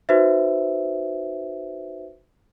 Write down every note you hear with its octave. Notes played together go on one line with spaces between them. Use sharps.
D#4 F#4 B4 C5 E5